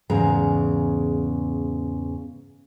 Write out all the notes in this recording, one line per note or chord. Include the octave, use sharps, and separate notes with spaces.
E2 G#2 C#3 G#3 A#5